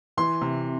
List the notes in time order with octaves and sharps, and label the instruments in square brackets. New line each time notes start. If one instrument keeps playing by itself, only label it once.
[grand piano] E3 C6
C3